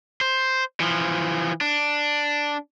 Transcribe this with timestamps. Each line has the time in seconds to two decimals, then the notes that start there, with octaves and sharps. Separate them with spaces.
0.21 C5
0.80 E3 F3
1.61 D4